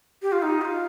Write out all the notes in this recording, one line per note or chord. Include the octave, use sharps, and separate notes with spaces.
G4
F4
D#4
G4
F4